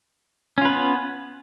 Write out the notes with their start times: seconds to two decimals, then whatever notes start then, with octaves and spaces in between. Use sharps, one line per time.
0.58 C#4
0.61 F4
0.65 B4
0.69 B3